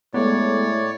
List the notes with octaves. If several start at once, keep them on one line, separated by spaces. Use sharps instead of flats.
A2 G#3 A3 B3 C#5 D5